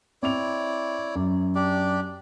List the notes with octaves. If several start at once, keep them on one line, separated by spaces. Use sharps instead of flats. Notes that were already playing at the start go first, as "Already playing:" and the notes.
C4 E4 C#5 D5 F7
F#2
D4 G4 D5